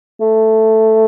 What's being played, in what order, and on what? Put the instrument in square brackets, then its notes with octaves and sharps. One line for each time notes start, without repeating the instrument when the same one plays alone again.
[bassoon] A3